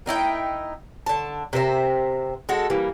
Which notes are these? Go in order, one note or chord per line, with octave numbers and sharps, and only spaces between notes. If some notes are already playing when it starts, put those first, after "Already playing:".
A#3 D#4 E4 G5
D3 A5
C3 A#4 C5 E5
G#3 F#4 A4
E3 G3 A#3